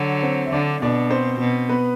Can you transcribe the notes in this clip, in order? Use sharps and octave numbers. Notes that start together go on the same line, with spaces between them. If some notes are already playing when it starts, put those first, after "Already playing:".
Already playing: D3 F#3
C4 C5
E5
D3 D4 D5
B2 D4 D5
C4 C5
B2
B3 B4